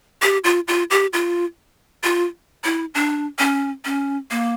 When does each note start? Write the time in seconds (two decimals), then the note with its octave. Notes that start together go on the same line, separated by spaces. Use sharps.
0.22 G4
0.44 F4
0.68 F4
0.90 G4
1.13 F4
2.03 F4
2.64 E4
2.95 D4
3.39 C#4
3.85 C#4
4.31 A#3